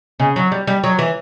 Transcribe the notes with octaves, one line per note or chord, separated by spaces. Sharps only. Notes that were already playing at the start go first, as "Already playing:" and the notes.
C#3
F#3
G3
G3
F#3
E3